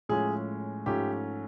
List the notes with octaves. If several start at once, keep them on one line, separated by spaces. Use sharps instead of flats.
A2 F3 G#3 C#4 G#4
G#2 F3 A3 C#4 G4